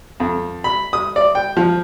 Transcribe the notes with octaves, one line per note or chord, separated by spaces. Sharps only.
F2
B5
D#6
D5
G5
F3